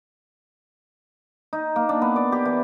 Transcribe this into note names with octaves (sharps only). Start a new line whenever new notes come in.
D#4
A#3
D4
B3
D5
G4
E3